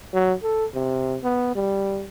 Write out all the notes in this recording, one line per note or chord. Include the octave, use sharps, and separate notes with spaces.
F#3
A4
C3
B3
G3